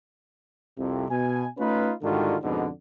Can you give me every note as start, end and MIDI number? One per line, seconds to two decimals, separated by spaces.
0.77 1.09 36
0.77 1.09 41
0.77 1.09 48
1.09 1.45 47
1.09 1.45 80
1.58 1.91 57
1.58 1.91 61
1.58 1.91 63
1.58 1.91 65
1.58 1.91 71
2.02 2.36 44
2.02 2.36 50
2.02 2.36 51
2.02 2.36 55
2.02 2.36 65
2.02 2.36 66
2.42 2.67 41
2.42 2.67 44
2.42 2.67 47
2.42 2.67 50